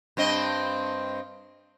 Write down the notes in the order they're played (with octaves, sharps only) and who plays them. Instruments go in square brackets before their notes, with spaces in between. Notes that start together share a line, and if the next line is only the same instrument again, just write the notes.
[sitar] G2 C4 D#5